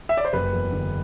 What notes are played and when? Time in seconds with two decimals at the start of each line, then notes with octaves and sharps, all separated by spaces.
0.09 E5
0.17 D5
0.25 C5
0.33 F#1 B4
0.53 E2
0.72 D3